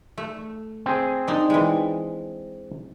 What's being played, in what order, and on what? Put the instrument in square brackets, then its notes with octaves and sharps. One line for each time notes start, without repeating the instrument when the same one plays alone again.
[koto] A3
[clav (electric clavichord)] C4 G#4
[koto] D4 D#4
E3 G#3